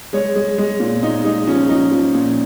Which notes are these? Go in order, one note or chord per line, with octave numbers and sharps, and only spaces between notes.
G#3 C#5
G#3
G#3
A#2
A#2 D#4
G#3 D#4
F3 C#4
F3 D#4
F3
A#2